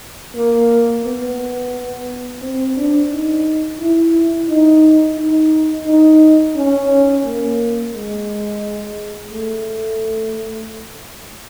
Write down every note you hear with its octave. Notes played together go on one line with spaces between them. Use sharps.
A#3
B3
C4
D4
D#4
E4
D#4
D#4
D#4
C#4
A#3
G#3
A3